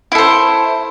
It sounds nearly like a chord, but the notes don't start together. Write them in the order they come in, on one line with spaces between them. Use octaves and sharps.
E4 A4 C5